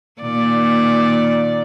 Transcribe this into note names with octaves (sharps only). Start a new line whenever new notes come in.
A#2 D#3 D5